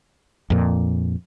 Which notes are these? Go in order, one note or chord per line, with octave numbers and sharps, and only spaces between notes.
F2 A#2